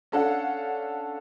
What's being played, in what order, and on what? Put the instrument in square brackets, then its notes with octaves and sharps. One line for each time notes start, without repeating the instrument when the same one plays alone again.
[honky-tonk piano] C#4 D4 A4 F5 F#5